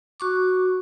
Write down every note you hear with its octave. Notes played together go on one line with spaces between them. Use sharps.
F#4 C#6 D6